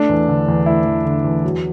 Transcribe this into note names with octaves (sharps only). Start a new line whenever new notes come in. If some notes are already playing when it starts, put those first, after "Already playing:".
Already playing: A3 D4
E2
D3
E2
A3 E4
E2
D3
E2
F#3